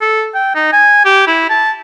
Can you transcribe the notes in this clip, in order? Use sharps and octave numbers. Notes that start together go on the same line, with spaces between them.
A4
G5
D#4
G#5
G4
E4
A5